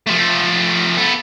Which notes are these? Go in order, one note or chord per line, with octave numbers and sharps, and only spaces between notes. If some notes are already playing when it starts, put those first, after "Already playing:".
F3 A3
B3 A4